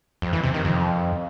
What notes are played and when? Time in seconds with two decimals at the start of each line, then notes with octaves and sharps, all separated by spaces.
0.22 F2
0.33 E3
0.43 C3
0.54 D#3
0.65 F2